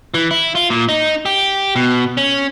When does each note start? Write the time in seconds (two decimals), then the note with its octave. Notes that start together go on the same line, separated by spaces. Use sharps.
0.14 E3
0.31 E4
0.55 F4
0.70 A#2
0.89 D#4
1.26 G4
1.76 B2
2.17 C#4